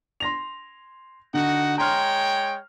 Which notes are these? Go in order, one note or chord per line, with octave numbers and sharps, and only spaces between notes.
C6 A#6 F7
D3 D#4 F#4 F#5
G#3 C#5 G5 A#5 C6 F6